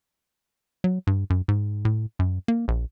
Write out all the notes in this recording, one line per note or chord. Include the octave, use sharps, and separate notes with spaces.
F#3
G2
F#2
G#2
A2
F#2
A#3
A#1